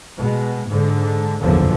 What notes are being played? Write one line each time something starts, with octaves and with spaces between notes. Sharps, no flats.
B2 G#3
G#2 D3
F#1 B1 E2 A#2 D3 F3